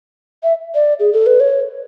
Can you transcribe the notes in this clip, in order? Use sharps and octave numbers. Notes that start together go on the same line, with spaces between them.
E5
D5
G#4
A4
B4
C#5